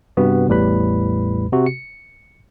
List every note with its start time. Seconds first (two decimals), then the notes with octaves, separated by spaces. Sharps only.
0.17 G2 C3 B3 F#4
0.47 A1 E2 A2 G3 B4 B5
1.53 C3 F#4
1.66 C#7